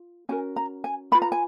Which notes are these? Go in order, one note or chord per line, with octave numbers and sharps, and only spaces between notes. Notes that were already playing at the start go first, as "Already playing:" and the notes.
Already playing: F4
C#4 F#4 A#4 G#5
A#5
G#5
F4 B4 B5
A#5
G#5